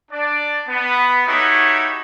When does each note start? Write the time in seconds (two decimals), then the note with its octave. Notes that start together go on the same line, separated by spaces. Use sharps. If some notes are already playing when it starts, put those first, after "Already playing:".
0.12 D4 D5
0.68 B3
1.27 A3 D#4 E4 F#4 G4 C#5